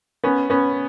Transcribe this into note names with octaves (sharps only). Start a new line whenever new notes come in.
B3 C#4
B3 C#4